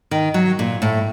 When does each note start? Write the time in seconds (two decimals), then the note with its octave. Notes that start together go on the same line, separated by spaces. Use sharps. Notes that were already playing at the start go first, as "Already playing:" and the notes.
0.11 D#3
0.34 F#3
0.59 A#2
0.82 A2